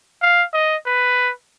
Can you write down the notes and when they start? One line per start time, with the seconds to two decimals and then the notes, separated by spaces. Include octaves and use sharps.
0.21 F5
0.53 D#5
0.86 B4